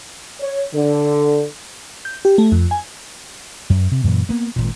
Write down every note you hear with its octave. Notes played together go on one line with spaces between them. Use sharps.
C#5
D3
G6
G4
A3
F2
G#5
F#2
C3
F#2 A#2 D#3 E3
A#3 B3
G#1 C#2 A#2